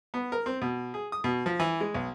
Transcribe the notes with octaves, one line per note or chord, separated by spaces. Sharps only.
B3
A#4
C4
B2
G#4
D#6
B2
F3
E3
G#3
B1